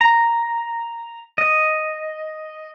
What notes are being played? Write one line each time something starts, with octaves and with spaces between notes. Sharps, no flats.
A#5
D#5